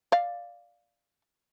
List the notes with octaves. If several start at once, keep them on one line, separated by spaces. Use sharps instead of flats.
D5 F5